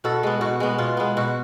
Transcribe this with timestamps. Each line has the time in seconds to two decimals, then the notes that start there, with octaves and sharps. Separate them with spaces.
0.04 B2 F#4 A4
0.23 G#3 B3
0.41 B2 F#4
0.60 G#3 B3
0.78 B2 F4
0.97 G#3 B3
1.17 B2 F#4